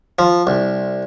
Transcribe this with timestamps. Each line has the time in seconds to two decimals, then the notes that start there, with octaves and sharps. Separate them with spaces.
0.19 F3
0.47 C2